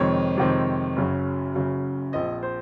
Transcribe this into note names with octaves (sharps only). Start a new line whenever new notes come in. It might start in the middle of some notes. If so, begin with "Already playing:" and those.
Already playing: F2 C3 D#3 G#3 C4 C#5
F2 C3 D#3 G#3 C4
F#1 F#2 C#3 F#3
F#1 F#2 C#3 F#3
A#1 A#2 F3 C4 D#5
C5